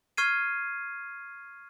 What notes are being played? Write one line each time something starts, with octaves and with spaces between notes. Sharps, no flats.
C#6 F6 G#6 C7 D#7